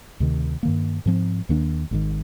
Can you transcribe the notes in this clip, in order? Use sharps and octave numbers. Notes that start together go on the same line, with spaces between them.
D2 C3 D#3
G2 D#3 A#3
G#2 F3 C4
D#2 D#3 A#3 D4
G#1 G#2 D#3